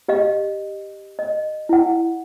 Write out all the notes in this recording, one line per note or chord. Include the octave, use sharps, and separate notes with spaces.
G4 D#5 F5
D#5
E4 F#5